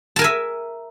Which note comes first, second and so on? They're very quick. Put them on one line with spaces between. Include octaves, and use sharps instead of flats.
A5 A#4 G#5 E5